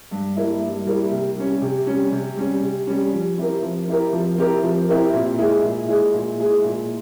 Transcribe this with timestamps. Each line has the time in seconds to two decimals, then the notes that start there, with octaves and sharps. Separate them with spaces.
0.11 G2
0.37 G3 A#3 E4
0.61 G2
0.87 G3 A#3 E4
1.11 C3
1.37 G3 C#4
1.62 C3
1.87 G3 C#4
2.12 C3
2.37 G3 C#4
2.62 C3
2.87 G3 C#4
3.13 F3
3.38 C4 E4 G4 A#4
3.63 F3
3.88 C4 E4 G4 A#4
4.13 F3
4.38 C4 E4 G4 A#4
4.63 F3
4.89 C4 E4 G4 A#4
5.13 A#2
5.38 G#3 E4 G#4
5.64 A#2
5.88 G#3 E4 G#4
6.14 A#2
6.39 G#3 E4 G#4
6.64 A#2